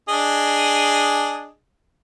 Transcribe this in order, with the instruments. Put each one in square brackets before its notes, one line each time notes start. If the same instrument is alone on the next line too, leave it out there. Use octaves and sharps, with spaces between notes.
[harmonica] D4 G#4 D#5